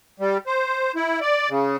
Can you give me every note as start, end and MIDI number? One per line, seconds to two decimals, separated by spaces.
0.20 0.38 55
0.47 0.92 72
0.96 1.20 64
1.21 1.49 74
1.49 1.77 49